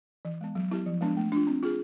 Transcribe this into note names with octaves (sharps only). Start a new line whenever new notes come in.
E3
G#3 B3
F#3
B3 E4 G4
F3
G#3 B3 D4
A3
D4 F4
C4
F4 G#4